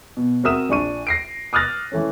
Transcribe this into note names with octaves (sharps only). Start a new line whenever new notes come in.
B2
C4 F#4 A#4 E5 D#6 E7
A#1 D4 C#6 D#7
A#6 C7 D7
D6 D#6 F6 F#6 A6 A#6
E3 A3 C#4